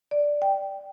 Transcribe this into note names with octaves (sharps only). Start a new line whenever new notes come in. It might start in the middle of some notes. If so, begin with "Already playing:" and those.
D5
G5